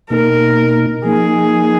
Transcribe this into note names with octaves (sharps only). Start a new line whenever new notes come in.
B2 A#3 D#4 A#4
F3 A#3 D#4 G#4